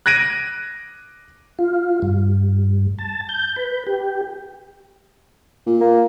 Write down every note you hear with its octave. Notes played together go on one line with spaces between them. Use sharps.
F#6 G#6 A#6 D7 D#7
F4
G2
A5
G6
B4
G4
A#2
A#3